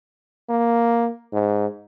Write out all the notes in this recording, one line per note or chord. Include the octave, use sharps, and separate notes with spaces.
A#3
G#2